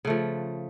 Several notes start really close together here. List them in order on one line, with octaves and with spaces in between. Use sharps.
C#3 A3 F3